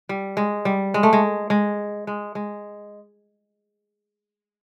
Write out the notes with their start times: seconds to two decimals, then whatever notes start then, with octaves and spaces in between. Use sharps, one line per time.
0.09 G3
0.37 G#3
0.65 G3
0.94 G#3
1.03 A3
1.13 G#3
1.50 G#3
2.07 G#3
2.35 G#3